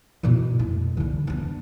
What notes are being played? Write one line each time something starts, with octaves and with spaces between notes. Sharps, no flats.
B2 E4
F1 E4
C2 D3
B3 D4